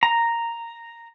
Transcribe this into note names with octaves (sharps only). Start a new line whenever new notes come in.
A#5